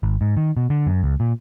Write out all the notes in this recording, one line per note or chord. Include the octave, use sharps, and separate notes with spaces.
G#1
G#2
D#3
B2
D3
F#2
C#2
A#2